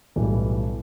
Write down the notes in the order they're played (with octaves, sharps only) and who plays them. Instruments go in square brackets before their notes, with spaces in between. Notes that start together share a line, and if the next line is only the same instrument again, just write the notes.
[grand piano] B1 A2 E3 G3